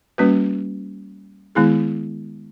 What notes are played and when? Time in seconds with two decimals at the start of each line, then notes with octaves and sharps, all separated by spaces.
0.18 G3 A#3 C#4 F#4 B4
1.55 D#3 G#3 B3 E4 G#4